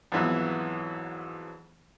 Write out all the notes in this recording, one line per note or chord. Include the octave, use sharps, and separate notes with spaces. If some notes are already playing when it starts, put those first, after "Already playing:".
F2 G#2 E3 F#3 B3